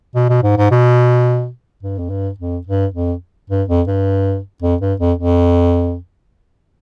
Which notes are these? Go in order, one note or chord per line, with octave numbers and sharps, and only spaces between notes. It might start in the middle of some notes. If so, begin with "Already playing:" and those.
B2
B2
G#2
G#2
B2
G2
F2
G2
F2
G2
F2
G2
F2
G2
F2
G2
F2
F2